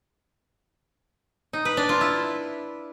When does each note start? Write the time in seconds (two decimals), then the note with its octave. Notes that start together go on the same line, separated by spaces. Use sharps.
1.53 D#4
1.65 B4
1.77 D4
1.89 F4
2.01 E4